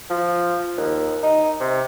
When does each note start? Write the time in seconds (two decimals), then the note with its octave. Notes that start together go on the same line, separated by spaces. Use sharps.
0.10 F3
0.78 D#2
1.23 D#4
1.60 C3